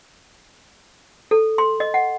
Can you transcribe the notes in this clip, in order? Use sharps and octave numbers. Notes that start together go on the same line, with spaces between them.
A4
C6
D#5
F#5